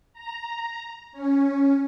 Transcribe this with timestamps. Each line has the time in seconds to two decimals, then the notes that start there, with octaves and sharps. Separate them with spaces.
0.13 A#5
1.12 C#4